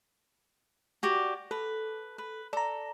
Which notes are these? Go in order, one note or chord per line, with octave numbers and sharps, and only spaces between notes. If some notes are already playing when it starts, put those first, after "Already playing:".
F#4 G4 D5
A4 B4
B4
A4 D5 A#5